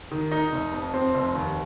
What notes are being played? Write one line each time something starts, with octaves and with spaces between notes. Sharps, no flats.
D#3
D#4
F1
F2
C4
F1
D#2